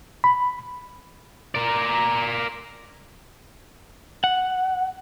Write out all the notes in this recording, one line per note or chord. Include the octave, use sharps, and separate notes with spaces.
B5
A#4 D5
F#5